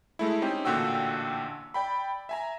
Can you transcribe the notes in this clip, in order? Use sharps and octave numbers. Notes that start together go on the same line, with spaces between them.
G#3 A3 E4
C4 C#4 D#4 G4
A1 A#2 D3 F#4 G5 E6
D5 G5 B5
E5 G#5 A#5